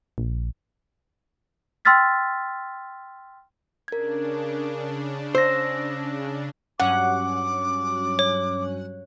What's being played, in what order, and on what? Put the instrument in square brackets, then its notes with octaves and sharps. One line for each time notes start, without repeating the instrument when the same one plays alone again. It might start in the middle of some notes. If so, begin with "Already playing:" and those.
[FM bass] A#1
[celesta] G5 C6 E6 F6 A6 B6
[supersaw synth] C#3 D4 [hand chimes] A#4 G#6
[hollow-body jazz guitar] C5 [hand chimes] E6 A#6
[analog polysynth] G2 F#3 C#4 [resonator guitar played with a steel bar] F#5 [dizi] D6
[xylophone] C#5